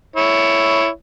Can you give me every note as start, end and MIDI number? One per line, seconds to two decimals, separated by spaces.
0.16 0.87 64
0.16 0.87 73